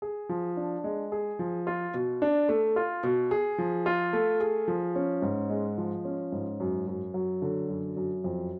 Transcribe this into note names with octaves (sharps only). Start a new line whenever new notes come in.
G#4
F3
D4
G#3
G#4
F3
F4
B2
D4
A3
F4
B2
G#4
F3
F4
A3
G#4
F3
C#4
G#2
G#3
F3
C#4
G#2
F#2
F#2
F#3
D3
F#2
F#2
F2